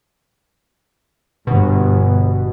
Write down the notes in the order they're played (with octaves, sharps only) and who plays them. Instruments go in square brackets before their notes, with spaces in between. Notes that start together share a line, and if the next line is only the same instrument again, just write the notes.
[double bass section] G1 [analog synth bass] B2